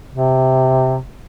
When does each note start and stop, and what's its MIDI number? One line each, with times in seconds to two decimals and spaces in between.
0.11 0.98 48